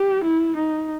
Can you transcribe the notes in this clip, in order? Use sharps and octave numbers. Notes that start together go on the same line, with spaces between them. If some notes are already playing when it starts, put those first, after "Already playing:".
Already playing: G4
E4
D#4